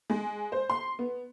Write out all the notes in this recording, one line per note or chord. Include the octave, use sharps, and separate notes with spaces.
G#3
C5
C6
B3